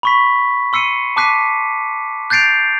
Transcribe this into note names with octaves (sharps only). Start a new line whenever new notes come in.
B5 C#6 B6
C6 E6 C7 C#7 D#7
A5 D6 F#6 B6 C7 D#7
F#6 G6 A6 C7 D7 F7